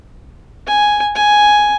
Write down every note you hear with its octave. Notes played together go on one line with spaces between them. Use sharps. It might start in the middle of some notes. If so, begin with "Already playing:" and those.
G#5
G#5